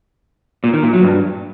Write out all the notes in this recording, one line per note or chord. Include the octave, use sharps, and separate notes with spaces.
A#2
D#3
A#2
F#3
G2